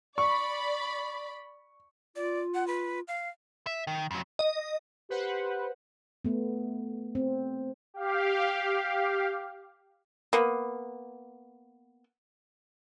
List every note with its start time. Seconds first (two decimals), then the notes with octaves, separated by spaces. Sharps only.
0.18 D5 B5 C#6
2.16 F4 D5
2.55 F#5
2.67 B4
3.08 F5
3.67 E5
3.87 D#3
4.11 F2 F#3
4.39 D#5
5.10 G4 B4 C5 F#5
6.24 A3 B3
7.15 C4
7.94 G4 F5
10.33 A#3 B3